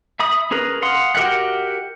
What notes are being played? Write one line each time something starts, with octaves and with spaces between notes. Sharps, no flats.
E5 B5 D#6
C#4 G#4 A#4 B4
F5 F#5 C6 D#6
F#4 G4 A#4 E5 F#5